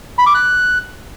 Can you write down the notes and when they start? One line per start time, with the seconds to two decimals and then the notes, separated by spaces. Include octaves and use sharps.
0.18 B5
0.26 D6
0.34 F#6